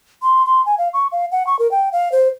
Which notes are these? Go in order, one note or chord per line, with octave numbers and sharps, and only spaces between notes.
C6
C6
G#5
F5
C#6
F5
F#5
C#6
A#4
G5
F5
C5